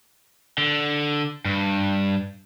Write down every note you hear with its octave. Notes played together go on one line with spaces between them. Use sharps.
D3
G2